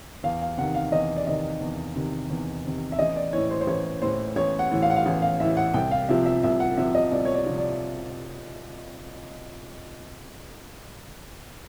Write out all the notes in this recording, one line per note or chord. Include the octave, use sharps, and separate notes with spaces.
E2 F5
F5
C3 D#3 F#5
F5
E2 D#5
D5
C3 D#3 D#5
E2
C3 D#3
E2
C3 D#3
E5
A1 D#5
D5
A2 E3 C#5
C5
C5
A1 C#5
A2 E3 C5
A1 C#5
F#5
A2 E3
F5
F#5
F5
A1
F5
A2 E3 E5
F#5
C2 G5
F5
C3 F3 E5
E5
C2 E5
F#5
C3 F3 E5
D#5
C2 D5
C#5
D5
C3 F3
D5